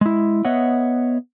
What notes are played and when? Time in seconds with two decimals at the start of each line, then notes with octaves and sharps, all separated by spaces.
0.01 G#3 E4
0.45 B3 C#5 D#5 E5 F#5